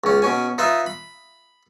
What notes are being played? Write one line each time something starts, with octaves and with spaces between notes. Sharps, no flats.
C#2 C#4
B2 C#4 G#5
D#4 F4 B4 D#5 E5
B5